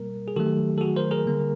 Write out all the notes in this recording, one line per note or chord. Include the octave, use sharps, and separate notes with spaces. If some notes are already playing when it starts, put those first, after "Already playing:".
Already playing: B2 G3 A#3 A#4
G#4
D#3 F#3 A3 G4 A4
A4
F#4 G#4
A#4 C5
G#4 A#4
D3 G3 A#3